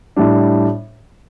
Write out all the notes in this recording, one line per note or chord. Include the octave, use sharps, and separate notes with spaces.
A2 G3 D4